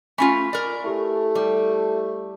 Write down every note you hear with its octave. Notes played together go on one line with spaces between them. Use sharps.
A3 C#4 F4 G#5 B5 B6
A#4 D5
A3 E4 G4 A4
G3